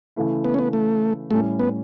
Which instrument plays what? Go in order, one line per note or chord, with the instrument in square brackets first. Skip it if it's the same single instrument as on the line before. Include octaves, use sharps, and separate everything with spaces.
[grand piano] C#3 E3 A3 E4
[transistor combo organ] B3
C#4
B3
A3
[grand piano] A2 G3 C#4 E4 [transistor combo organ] A3
[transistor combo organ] B3